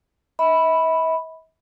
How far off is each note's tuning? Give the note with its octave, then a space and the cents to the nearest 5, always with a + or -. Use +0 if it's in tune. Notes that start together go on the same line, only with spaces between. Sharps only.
E5 -45 B5 +0